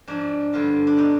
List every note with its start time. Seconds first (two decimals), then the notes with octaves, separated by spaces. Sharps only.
0.08 G#2 F3 D4
0.53 G2 D3 F3 F4
0.87 D4
0.97 B2 D#4